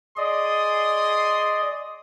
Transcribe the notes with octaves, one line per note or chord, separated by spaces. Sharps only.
G#4 D5 D#5 C6 D#6